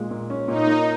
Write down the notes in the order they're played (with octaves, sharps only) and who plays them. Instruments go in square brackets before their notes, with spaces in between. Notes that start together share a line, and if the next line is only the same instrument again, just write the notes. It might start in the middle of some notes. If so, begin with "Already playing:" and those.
Already playing: [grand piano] A#2 G#3
A#2
C#4
[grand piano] A#2 [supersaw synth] D#4
[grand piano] A#3